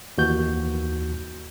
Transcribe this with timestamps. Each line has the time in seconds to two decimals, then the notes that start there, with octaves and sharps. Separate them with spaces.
0.18 D#2 E3 F#4 G6